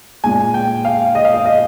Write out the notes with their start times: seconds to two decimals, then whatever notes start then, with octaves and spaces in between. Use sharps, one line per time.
0.24 A#2 G#3 G#5
0.54 G5
0.85 F5
1.15 D#5
1.25 F5
1.34 D#5
1.46 D#5